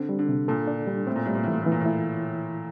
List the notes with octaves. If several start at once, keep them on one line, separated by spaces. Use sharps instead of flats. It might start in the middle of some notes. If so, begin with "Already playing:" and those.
Already playing: D3 C4
G3
D3
C3
A#2 A4
D4
G3
A2 C4
A#2
A2 G3
A#2
A2 E3
A#2
A2 E3
A#2
A2
E4